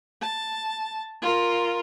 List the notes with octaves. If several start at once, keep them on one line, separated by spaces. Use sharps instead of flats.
A5
F4 A#4